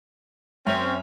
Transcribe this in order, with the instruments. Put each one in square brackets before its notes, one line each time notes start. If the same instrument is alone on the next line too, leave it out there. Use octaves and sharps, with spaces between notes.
[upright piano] F#2 E5 F7 [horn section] C4 C#4